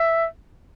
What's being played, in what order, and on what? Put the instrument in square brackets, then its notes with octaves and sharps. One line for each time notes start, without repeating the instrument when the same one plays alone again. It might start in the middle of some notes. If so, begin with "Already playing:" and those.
Already playing: [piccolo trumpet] E5